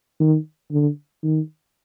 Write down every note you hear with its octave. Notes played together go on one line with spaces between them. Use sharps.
D#3
D3
D#3